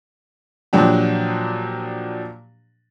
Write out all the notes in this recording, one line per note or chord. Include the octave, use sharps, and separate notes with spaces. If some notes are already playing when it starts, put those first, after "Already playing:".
A#2 F3 F#3 D4 G4